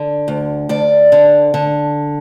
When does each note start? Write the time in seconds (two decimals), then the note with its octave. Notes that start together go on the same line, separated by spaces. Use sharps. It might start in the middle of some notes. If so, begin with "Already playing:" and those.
Already playing: D3
0.28 D2
0.69 D2 D5
1.12 D3
1.54 D3